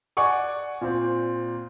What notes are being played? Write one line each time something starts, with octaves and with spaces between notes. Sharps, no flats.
D5 F#5 G#5 C#6 D6
A#2 C4